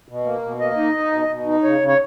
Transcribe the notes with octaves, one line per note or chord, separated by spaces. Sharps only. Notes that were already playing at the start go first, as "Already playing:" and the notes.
B2
A#3
B2
A#3 D#5
D#4
D#4
B2
B2
D#4
C#3 C#5
C#3
C#5